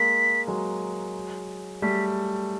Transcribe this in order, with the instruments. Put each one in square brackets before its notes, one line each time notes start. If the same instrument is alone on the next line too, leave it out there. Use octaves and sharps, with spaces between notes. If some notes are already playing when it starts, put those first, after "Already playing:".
Already playing: [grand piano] G#3 A#3 [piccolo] B6
[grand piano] F#3 G#3
[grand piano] G3 A3 [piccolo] B6